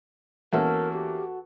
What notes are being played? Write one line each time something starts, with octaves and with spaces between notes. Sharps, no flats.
E2 A#3 C#4 F#4 A4 A#4
G4